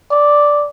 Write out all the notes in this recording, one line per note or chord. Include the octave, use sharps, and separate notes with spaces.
D5